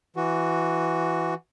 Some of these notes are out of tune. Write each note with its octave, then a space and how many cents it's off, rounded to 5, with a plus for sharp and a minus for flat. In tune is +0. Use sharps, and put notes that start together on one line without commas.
E3 +10 F#4 +0